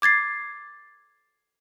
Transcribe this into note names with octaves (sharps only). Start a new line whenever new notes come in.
D6 G#6 A6 C7